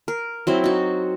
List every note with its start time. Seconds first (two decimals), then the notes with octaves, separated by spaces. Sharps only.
0.08 A#4
0.47 F#3 C4 E4
0.64 D#4 F#4